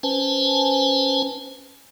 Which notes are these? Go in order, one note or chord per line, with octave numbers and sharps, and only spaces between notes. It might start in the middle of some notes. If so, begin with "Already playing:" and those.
C#4 B4 C5 G#5 A5